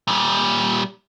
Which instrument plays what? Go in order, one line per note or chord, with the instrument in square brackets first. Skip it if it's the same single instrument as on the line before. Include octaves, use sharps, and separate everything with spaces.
[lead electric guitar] A#2 G3